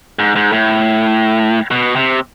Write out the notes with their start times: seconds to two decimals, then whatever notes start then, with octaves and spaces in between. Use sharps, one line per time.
0.19 G#2
0.36 G#2
0.52 A2
1.71 B2
1.96 C3